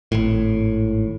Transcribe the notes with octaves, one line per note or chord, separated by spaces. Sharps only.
G#1 A2